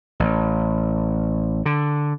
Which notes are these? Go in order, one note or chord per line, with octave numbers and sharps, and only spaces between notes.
A1
D3